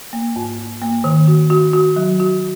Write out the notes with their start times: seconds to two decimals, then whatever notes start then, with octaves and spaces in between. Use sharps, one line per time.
0.13 A#3
0.36 G#2
0.58 G#2
0.82 A#3
1.04 D#3
1.28 F#4
1.50 F#4
1.73 F#4
1.96 F#3
2.20 F#4